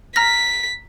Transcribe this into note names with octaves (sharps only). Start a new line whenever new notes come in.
A#5 F6 A#6 B6